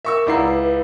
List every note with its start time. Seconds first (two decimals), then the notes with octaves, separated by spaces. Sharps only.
0.05 A#4 E5 C#6 E6
0.26 C#2 E4 D5 F#5 A#5 C7
0.48 B4